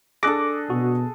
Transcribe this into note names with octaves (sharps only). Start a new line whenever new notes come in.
D4 G#4 A4 D6 F#6 A#6
B2 F#4